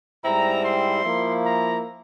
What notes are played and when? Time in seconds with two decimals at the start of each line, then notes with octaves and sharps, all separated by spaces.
0.25 G#2 G3 C4 E4 A#5
0.64 C6
1.05 F3 A#3 E4
1.44 A#5